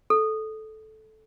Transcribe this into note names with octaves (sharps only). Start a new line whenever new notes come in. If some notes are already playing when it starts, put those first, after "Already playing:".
A4